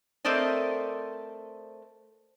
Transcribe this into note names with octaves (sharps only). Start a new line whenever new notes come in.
A3 C4 A#4 C5 D5 D#5